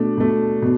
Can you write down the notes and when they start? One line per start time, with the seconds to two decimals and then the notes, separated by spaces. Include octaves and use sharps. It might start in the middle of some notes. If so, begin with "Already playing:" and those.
Already playing: B2 A3 D4
0.18 B2 A3
0.62 B2